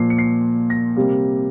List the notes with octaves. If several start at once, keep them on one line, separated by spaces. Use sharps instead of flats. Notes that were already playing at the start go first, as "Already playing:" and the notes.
Already playing: A#2 F3 A#3 C7
C#7
C7
A#6
C3 G3 A#3